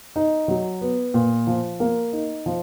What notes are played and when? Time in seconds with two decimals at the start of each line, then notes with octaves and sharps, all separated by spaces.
0.16 D#4
0.48 F#3
0.81 B3
1.14 A#2
1.47 F3
1.80 A#3
2.13 D#4
2.46 F3